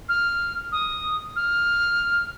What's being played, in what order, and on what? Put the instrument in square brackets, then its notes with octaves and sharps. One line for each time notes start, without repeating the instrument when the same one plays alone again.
[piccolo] F6
D#6
F6